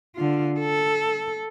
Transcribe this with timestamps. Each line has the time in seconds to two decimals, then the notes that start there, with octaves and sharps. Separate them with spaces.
0.15 D3 F4
0.60 A4